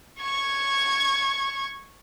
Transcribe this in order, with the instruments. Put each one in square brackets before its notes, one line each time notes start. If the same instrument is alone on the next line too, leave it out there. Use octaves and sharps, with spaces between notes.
[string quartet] C#6 G#6